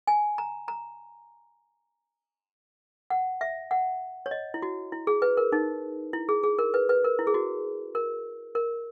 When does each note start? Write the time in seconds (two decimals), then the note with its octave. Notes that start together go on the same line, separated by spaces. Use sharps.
0.07 G#5
0.38 A#5
0.68 A#5
3.10 F#5
3.41 E5
3.71 F#5
4.26 C#5
4.31 D#5
4.54 E4
4.62 F#4
4.92 E4
5.07 G#4
5.22 B4
5.37 A#4
5.52 D#4
6.13 E4
6.29 G#4
6.43 G#4
6.59 A#4
6.74 B4
6.89 B4
7.04 A#4
7.19 E4
7.27 G#4
7.34 F#4
7.95 A#4
8.55 A#4